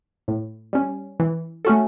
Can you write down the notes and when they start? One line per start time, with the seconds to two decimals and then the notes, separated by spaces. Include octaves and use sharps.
0.28 A2
0.73 G3 C#4
1.20 E3
1.65 A3 C#4 F#4 A4